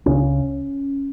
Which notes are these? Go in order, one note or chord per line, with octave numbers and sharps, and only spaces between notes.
C#2 C#3 C#4